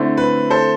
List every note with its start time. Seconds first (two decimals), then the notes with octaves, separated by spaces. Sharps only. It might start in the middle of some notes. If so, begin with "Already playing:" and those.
Already playing: D3 A3 C4 E4
0.18 B4
0.50 A4 C5